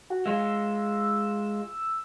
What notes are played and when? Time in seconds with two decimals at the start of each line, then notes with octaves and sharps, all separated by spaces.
0.10 F#4
0.26 G#3 F4 E6